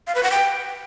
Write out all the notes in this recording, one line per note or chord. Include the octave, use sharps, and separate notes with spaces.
F5
B4
F#5
G5